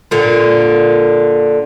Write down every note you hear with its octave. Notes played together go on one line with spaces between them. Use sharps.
A#2 D3